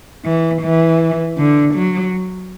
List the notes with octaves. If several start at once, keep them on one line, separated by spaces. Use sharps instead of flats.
E3
E3
D3
F#3